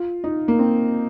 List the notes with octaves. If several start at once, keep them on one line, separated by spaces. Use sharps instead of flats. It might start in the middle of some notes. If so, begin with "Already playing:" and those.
Already playing: F4
D#4
A#3
C4